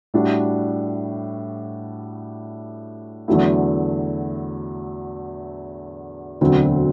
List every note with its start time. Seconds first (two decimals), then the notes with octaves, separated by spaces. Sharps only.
0.14 A2 G3 D4 F#4
3.28 E2 D3 F#3 A3 E4
6.41 E1 D2 D3 F#3 C4